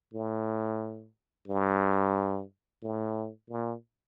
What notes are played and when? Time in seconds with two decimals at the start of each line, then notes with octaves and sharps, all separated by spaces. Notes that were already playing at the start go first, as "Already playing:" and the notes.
0.14 A2
1.48 G2
2.82 A2
3.50 A#2